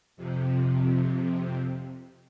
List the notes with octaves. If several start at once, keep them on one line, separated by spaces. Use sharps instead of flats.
F2 C3